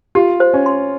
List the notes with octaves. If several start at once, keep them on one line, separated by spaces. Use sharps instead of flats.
F4 G4
C5
C#4
C6